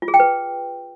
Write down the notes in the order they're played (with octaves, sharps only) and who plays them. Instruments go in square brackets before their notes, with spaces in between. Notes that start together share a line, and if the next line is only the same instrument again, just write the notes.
[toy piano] F4
G#4
G5
B4